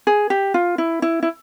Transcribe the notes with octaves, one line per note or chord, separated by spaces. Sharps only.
G#4
G4
F4
E4
E4
E4